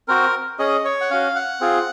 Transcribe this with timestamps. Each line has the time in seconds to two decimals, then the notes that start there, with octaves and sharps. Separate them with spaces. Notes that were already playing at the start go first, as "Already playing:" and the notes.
0.08 C4 F#4 A#4
0.59 C#4 G#4 D#5
0.85 C#5
1.01 F#5
1.11 C#4 F#4 F5
1.36 F#5
1.61 C4 F4 G#4